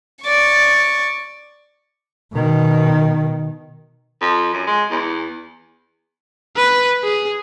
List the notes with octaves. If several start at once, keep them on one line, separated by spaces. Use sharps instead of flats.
D5 C#6
B2 D#3
F2
F#2
G#3
E2
B4
G#4